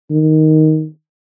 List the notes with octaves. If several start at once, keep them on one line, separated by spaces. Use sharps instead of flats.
D#3